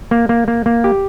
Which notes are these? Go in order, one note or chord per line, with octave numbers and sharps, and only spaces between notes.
A#3
A#3
A#3
A#3
G4